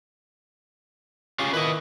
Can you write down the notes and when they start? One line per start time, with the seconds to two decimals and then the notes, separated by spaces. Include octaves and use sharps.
1.39 C#4 F4 G4 G#4
1.53 D#3 E3 E4 B4 D#5